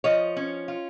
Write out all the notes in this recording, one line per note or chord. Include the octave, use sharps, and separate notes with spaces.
F3 C#5 D#5
C#4
F4